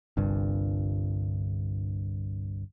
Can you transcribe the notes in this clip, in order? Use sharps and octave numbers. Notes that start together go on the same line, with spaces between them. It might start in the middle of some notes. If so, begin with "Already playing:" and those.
G1 C2 G2